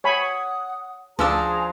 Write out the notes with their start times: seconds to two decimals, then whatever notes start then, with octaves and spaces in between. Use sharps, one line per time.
0.04 C#5 F#5 G#5 B5 D#6
1.19 D2 F3 D4 G#4 C5 A#5 E6